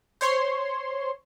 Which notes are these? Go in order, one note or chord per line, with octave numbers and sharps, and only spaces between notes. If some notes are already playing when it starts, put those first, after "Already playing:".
C5 C#5 C6